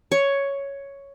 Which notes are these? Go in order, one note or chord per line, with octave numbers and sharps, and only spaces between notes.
C#5